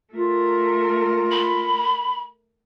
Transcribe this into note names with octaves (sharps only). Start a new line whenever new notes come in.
A3 F4 A#4
B5